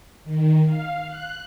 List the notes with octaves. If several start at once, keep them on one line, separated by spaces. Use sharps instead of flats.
D#3
F5
F#6